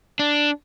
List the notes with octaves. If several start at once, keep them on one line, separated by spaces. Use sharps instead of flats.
D4